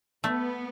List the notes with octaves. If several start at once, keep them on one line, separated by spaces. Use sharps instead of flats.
A3 B3